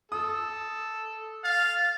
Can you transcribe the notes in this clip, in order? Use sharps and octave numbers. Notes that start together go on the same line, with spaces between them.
A4 D#6
F5 A6